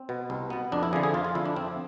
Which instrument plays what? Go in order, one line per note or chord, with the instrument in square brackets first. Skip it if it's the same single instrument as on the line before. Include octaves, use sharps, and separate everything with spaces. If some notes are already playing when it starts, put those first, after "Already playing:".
Already playing: [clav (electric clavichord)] C4
B2 B3
C2
B2 B3
F2 D4
E4
D3 F3 G#4
G#4
F2 F4
F4
D3 F3 E4
D4
F2 C4